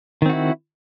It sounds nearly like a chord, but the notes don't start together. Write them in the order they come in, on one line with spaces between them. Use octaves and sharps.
D#3 C4 F#4 E4